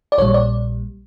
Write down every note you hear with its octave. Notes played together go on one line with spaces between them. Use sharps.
D5
A#1 A#2 G3 C#5
D5